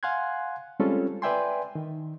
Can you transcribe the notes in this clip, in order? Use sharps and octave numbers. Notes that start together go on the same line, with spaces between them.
F5 F#5 G#5 C6 F#6 G#6
G3 G#3 C4 C#4 F4 A4
B4 D5 E5 G5 G#5 C6
D#3